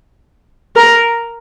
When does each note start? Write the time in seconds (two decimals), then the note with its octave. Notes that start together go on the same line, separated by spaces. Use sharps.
0.76 A#4